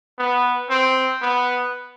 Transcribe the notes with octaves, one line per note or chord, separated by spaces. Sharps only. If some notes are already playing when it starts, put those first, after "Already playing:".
B3
C4
B3